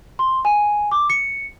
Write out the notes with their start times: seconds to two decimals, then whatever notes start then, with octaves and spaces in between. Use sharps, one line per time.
0.19 C6
0.45 G#5
0.91 D6
1.10 C#7